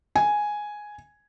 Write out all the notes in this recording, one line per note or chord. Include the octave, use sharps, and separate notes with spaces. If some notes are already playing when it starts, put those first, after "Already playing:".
G#5